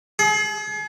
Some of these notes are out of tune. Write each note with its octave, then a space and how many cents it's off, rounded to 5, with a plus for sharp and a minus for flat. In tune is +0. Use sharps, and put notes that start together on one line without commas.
G#4 +40